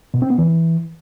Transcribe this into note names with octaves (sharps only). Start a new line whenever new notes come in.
B2
C4
B3
E3